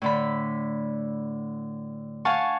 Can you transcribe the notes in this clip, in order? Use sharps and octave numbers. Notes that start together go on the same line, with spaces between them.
A2 D3 B5
F5 F#5 G#5 A5 C#6